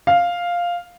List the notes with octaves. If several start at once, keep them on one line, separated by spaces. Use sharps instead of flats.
F5